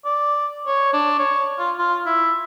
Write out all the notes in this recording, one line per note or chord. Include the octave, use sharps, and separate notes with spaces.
D5
C#5
D4
C#5
F4
F4
E4